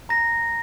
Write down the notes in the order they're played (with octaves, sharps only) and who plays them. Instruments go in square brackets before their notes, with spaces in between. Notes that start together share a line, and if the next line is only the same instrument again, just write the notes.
[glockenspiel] A#5 A#6